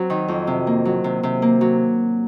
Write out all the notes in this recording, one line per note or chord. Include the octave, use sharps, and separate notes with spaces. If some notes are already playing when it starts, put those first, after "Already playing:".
Already playing: F#3 C4
D#3
F2
C3
A#3
F#3
C3
C3
A#3
F#3